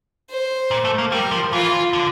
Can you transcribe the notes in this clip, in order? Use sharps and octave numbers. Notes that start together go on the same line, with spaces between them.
C5
A#2
A3
A#3
G3 A#4
F3
E3 F4
D3